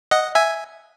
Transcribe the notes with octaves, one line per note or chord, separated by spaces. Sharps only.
D#5 F#5
E5 G#5